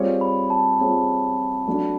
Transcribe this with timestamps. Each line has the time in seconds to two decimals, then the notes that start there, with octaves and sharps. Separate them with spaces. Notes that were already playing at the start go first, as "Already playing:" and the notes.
Already playing: G3 C4 F4 G#4 C#5
0.21 B5
0.50 A5
0.79 G3 C4 F4 G#4 C#5
1.67 F#3 A3 D4